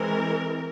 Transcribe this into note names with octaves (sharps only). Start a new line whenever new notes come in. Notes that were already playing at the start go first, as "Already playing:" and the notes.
Already playing: E3 G#3 C4 A#4